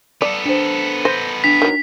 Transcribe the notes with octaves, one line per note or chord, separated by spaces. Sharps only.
B3 A4 D5
D4 C5
C5 G6 A#6
D4 B6 F7
D#3 F#3